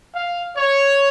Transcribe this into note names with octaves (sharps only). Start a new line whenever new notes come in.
F5
C#5